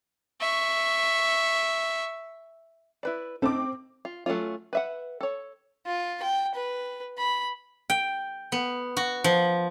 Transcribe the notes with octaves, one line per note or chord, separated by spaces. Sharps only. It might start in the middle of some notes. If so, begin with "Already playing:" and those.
E5 C#6
E4 B4 D5
A3 C4 D#4 A4 D6
F4
F#3 A3 B3 C#4 F4
B4 E5 F#5
A4 C#5
F4
G5
B4
B5
G5
B3
F#4
F3